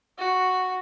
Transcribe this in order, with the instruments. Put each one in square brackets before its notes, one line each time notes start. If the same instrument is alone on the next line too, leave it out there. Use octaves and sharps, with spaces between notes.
[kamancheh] F#4